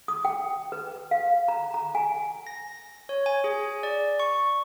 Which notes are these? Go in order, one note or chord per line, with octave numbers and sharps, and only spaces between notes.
D#6
G5
B4
F5
A#5
A#5
G#5
A#6
C#5
G#5
G#4
D5
C#6